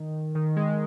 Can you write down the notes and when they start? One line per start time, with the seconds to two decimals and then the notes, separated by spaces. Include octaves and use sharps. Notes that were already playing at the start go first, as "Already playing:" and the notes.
Already playing: D#3
0.35 D#3
0.56 G#3